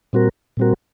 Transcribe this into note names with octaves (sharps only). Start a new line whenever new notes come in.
A#2 G3 C4 F#4 A#4
A#2 G3 C4 F#4 A#4